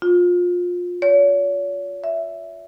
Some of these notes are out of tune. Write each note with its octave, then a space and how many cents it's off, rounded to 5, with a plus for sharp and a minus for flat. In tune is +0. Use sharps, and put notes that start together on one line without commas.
F4 +25
C#5 +40
E5 +5